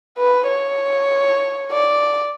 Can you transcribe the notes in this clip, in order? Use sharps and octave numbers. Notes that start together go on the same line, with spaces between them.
B4
C#5
D5